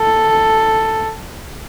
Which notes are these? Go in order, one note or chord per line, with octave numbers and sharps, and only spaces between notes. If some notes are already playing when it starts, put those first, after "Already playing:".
Already playing: A4